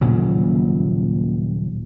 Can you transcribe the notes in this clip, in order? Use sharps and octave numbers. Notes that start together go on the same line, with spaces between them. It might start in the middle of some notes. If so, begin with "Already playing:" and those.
D#1 A#2 C#3 F#3